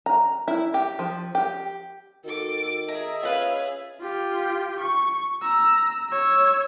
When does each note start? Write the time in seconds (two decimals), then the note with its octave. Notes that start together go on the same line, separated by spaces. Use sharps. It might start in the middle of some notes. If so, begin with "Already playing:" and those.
0.06 A#5
0.48 E4
0.74 G4
0.99 F3
1.35 G4
2.24 D#3 F#4 A4 D6
2.89 G#4 D#5 E5 A#5
3.23 C#4 F4 B4 F5
4.00 F4 G4
4.81 C#6
5.42 A#5 E6
6.09 C#5 E6